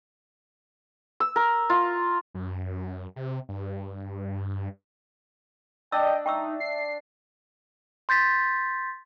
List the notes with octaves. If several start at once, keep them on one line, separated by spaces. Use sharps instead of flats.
E6
A#4
F4
F#2
C3
G2
D4 D#5 G5 E6
D#4 E5 G5 C#6 E6
C7
C6 G6 A6 B6